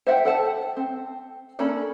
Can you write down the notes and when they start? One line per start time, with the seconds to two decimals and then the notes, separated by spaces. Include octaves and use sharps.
0.07 C5 E5 F#5 G5
0.25 A4 F#5 A5
0.77 C4
1.59 A#3 C#4 D4 A4 B5